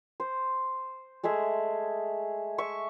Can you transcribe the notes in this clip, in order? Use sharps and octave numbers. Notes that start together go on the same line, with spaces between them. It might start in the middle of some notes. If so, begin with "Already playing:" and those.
C5
G#3 A3 G#4 E5
E5 C#6